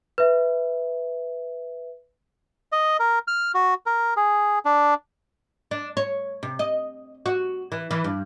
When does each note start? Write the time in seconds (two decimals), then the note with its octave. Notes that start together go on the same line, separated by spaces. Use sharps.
0.18 B4 E5
2.72 D#5
2.99 A#4
3.28 F6
3.54 F#4
3.86 A#4
4.17 G#4
4.65 D4
5.71 D4
5.97 C#5
6.43 C3
6.59 D#5
7.26 F#4
7.72 E3
7.91 E3
8.04 G2